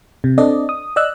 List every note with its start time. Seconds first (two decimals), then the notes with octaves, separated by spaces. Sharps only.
0.24 C3
0.38 C4 D4 A4 D5 D#5
0.69 D#6
0.96 D5 D#5 E6 F#6